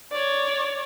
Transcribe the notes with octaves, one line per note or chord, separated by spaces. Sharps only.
C#5 D5